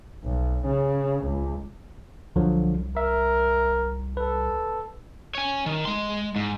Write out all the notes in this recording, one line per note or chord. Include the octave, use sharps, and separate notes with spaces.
B1
C#3
C#2
C2 D3 F3 F#3
A#4 E5
A4 B4
C#5 G#5
D#3
G#3 C6
G#2